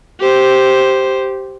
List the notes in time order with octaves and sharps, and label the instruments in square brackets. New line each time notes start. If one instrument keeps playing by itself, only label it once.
[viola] G4 C5